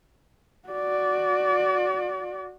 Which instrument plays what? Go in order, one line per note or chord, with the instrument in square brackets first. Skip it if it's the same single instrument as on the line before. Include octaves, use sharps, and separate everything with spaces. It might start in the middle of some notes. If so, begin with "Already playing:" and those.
[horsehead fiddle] F#4 D5